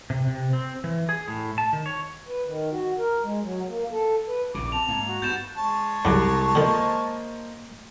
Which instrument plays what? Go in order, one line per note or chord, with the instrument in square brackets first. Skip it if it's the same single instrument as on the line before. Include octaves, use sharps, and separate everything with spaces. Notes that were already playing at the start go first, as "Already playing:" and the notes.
[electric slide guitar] C3
C3
C4
E3
G#4
A2
A5
D#3
C#5
[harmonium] B4
D#3
F#4
A#4
G#3
F#3
A#3
A4
B4
[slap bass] A#1 E2 C#3 [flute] D6
[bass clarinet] C4 [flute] A5 [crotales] F7
[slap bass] G#2 [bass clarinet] A#3
[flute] F#4
[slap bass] G2 [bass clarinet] B3 [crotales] G6 A6 E7
[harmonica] G#3 C#5 A5
[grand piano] C2 D6 [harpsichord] C#3 F#3
[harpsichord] D3 F3 [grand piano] A#3 C5 D#5